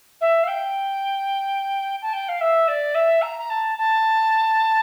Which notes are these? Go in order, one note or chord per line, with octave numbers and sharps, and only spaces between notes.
E5
F5
G5
A5
G5
F5
E5
D5
E5
A#5
A#5
A5
A5